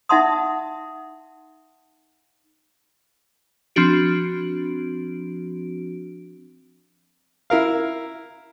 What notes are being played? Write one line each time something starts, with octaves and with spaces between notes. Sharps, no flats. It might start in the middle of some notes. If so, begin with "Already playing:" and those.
D#4 E5 F#5 A5 C6 D#6
F3 C4 D4 F#4 D7
E4 A#4 F5